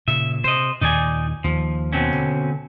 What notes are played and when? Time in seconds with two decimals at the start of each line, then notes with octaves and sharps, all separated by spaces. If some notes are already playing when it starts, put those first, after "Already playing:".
0.08 A#2 C#3 E5
0.44 C3 C5 D#5
0.81 D#2 A#2 D#4 D5 G#5
1.44 D#2 F3
1.93 B2 C4 C#4
2.12 D3